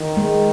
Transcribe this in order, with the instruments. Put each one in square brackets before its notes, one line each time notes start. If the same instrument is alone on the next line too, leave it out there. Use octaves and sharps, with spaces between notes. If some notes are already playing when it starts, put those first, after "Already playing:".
Already playing: [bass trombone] D#3
[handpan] G#3